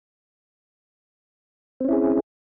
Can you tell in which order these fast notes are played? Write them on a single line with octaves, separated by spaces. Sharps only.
C4 C#4 E4 G#4